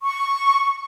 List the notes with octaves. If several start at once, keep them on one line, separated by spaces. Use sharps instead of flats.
C#6